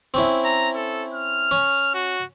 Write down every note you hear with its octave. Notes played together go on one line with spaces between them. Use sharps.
C4 C#4 E4
A#5
A4
F6
C#4
F#4